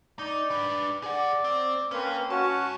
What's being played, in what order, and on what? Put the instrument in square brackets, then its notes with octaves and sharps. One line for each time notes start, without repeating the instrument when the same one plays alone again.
[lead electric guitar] D#4 [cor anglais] D5
[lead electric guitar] D4 B4
[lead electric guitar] G#4 F#5 [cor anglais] D5
[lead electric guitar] C4
[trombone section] A#3 C4 B4 [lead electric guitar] C#4
[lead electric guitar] G#2 A5 [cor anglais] C#4 [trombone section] F#4